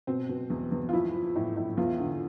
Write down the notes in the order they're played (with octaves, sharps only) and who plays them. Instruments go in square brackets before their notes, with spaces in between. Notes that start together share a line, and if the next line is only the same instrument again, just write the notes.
[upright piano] B2 C4
B2
E2
E2
F4
F3 E4
F3
A2
A2
E2 F4
D3